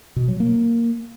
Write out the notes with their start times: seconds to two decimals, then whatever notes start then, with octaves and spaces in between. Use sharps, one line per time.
0.16 B2
0.28 F#3
0.40 A#3